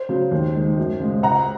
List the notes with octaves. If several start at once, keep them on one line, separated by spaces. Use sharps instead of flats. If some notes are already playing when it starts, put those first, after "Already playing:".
Already playing: C5
C#3 F#3
D#2
D#3 G#3
F#2
C#3 G#3
C#2 F#5 A#5